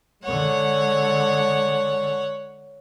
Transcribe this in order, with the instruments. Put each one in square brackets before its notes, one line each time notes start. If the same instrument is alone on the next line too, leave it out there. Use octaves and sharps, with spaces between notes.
[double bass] D3 G#3 [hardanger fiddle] C#5 F#5